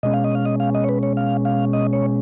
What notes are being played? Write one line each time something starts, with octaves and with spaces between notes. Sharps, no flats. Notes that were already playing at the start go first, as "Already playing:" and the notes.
B2 G#3 C#4 D#5
F5
D#5
F5
D#5
F5
D#5
C#5
B4
C#5
F5
F5
D#5
C#5